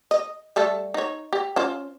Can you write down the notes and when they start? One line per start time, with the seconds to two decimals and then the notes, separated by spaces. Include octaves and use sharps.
0.11 D#5
0.56 G3 A3 A4
0.94 D#4 C#5
1.33 G4
1.56 C#4 F4 C5